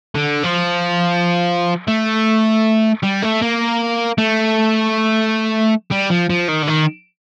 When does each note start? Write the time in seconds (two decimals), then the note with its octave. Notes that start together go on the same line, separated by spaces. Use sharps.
0.15 D3
0.44 F3
1.88 A3
3.03 G3
3.22 A3
3.41 A#3
4.18 A3
5.91 G3
6.10 F3
6.30 F3
6.48 D#3
6.63 D3
6.68 D#3